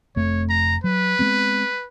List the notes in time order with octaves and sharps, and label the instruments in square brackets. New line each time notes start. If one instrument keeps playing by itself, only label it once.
[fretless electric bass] F1 F2 A3 [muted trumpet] C#5
[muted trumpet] A#5
[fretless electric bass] F#3 [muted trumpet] B4
[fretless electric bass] G#3 B3 C4